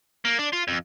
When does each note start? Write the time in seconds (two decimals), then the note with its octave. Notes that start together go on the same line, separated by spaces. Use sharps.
0.25 A#3
0.39 D4
0.53 F4
0.68 F2